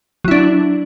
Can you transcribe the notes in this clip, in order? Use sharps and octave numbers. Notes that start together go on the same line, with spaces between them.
F#3 D4 E4